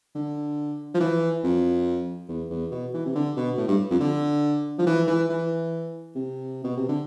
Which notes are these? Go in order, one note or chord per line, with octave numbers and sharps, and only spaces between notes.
D3
F3
E3
F2
E2
E2
B2
E3
C3
D3
B2
A2
G2
F2
D3
F3
E3
E3
E3
C3
B2
C3
D3